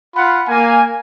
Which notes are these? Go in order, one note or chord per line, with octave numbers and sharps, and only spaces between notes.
F4 F#5 B5
A#3 G#5